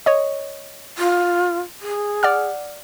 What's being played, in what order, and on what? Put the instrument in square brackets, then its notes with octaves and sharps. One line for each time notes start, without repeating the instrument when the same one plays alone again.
[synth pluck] C#5 D#5
[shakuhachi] F4
G#4
[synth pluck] D5 F#5 F6